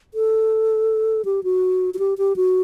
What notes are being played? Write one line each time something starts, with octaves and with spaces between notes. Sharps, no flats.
A4
G4
F#4
F#4
G4
G4
F#4